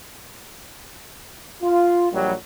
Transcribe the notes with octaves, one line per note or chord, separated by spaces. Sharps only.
F4
A#1 F#3 G3